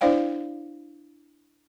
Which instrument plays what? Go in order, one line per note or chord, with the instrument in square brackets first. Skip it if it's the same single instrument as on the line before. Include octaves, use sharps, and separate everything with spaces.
[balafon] D4 E4 C5 D5 F5 G5